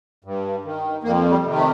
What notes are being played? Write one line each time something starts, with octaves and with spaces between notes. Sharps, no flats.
G2
D#3
F2 A#3
G3
C3 D#3
A3